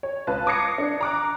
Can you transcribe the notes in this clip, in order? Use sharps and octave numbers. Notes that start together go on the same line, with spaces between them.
C#5
C#2 F4 B4 A5
D6 D#6 G#6 A#6 C7 C#7
D4
A#5 D6 F#6